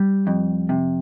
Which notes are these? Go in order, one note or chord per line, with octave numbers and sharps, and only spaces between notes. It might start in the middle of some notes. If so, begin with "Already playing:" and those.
Already playing: G3
F2
C3